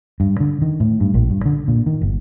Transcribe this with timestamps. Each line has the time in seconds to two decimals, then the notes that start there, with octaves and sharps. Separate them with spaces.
0.20 G2
0.40 D3
0.62 D#3
0.80 A2
1.00 G2
1.14 A#1
1.30 G2
1.46 D3
1.68 A#2
1.86 D#3
2.02 G1